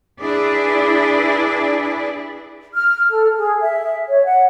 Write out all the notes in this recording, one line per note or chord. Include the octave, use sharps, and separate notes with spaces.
D4 E4 G#4 B4 D5
F6
A4
G#4
E5
C#5
F#5